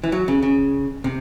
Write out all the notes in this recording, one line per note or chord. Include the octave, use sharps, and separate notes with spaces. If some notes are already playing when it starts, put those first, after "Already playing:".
E3
F#3
C#3
C#3
C3